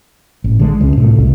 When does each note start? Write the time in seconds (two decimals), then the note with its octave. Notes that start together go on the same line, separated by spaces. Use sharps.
0.44 A1
0.59 D3 G#3
0.81 C#2 C#4
0.97 E1 A2 C3 A3
1.18 C2